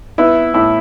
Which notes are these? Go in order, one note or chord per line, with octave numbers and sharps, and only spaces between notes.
B3 E4
A2 E4